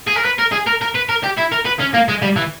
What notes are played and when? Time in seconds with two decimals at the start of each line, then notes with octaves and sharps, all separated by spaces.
0.07 G#4
0.16 A#4
0.25 B4
0.39 A#4
0.52 G#4
0.67 A#4
0.81 A#4
0.95 B4
1.09 A#4
1.24 G4
1.38 E4
1.52 A#4
1.66 B4
1.80 C#4
1.94 A#3
2.08 G#3
2.22 G3
2.36 E3